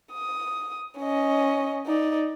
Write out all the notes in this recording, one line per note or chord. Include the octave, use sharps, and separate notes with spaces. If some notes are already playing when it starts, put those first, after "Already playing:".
D#6
C#4 D#5
D#4 D5